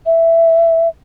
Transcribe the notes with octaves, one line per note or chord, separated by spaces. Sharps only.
E5